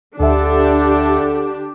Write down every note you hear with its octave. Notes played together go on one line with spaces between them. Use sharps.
D2 D3 D4 G4 A4 E5